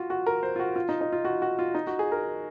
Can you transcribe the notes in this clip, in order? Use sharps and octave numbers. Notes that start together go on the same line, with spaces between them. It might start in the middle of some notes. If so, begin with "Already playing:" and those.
Already playing: F4 F#4
F#4
A#4
C5
F4
F#4
F4
D#4
D#4
F4
F#4
F#4
F4
D#4
F#4
G#4
A#4